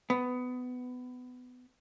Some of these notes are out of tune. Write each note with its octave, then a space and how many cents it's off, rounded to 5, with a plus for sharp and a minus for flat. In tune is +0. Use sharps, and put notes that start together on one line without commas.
B3 +20